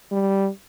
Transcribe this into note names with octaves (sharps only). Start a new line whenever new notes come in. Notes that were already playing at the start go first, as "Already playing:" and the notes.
G3